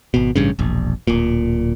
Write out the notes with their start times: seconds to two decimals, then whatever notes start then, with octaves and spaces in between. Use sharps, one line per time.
0.14 G#1 B2
0.36 A1 G2 C#3
0.59 E1 A#1
1.07 D1 A#2